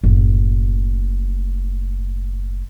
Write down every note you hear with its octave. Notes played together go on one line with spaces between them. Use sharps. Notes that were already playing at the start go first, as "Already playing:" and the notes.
F#1 A2